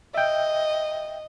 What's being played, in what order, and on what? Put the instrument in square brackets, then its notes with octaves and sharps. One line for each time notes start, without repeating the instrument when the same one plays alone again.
[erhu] D#5 [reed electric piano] E5 G5